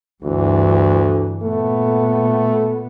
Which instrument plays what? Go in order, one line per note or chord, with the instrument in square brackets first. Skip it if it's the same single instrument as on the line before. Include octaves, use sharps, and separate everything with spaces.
[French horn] D2 [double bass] G2 E3
[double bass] A#2 B3 [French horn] A3